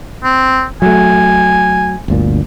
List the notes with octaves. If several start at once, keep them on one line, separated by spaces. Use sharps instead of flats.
C4
F#3 A3 G#5
G1 D2 A#2